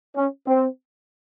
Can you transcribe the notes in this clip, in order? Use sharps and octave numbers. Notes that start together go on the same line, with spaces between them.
C#4
C4